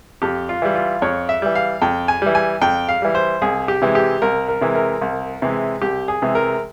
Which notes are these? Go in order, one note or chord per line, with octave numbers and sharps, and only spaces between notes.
F2 G4
F4
E3 G3
F4
F2 C#5
E5
E3 G3
F5
F2 G5
G#5
E3 G3
G#5
F2 G5
F5
E3 G3
C5
C2 G#4
G4
C3 E3 G#3
G4
C2 A#4
A#4
C3 E3 G#3
A#4
C2
C3 E3 G#3
C2 G4
G#4
C3 E3 G#3
A#4